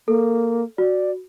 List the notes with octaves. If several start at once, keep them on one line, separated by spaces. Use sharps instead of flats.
A#3 A4
F#4 D5